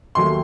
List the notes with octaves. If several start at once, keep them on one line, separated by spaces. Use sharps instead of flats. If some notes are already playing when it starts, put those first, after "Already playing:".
D#2 D#3 F#3 A3 C6